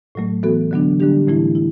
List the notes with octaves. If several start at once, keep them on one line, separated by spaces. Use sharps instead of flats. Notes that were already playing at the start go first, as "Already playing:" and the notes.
A2 F#3 A3
E3 B3 F#4 A4
D3 F#3 B3 D4
D3 G3 D4 G4
A2 E3 A3 E4
E4